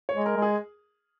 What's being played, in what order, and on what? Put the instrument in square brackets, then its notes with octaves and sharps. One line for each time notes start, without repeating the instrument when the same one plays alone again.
[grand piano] C#5
[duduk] G#3
[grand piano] A#4
[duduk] G#3
[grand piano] G#4